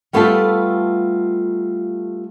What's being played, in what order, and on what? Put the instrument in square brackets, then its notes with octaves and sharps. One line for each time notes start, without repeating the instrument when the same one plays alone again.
[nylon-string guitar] G3 A3 B3 F4 G4 A4